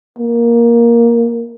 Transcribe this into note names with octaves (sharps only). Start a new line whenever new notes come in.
A#3